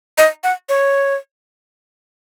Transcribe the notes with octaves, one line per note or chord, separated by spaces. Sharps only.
D#5
F#5
C#5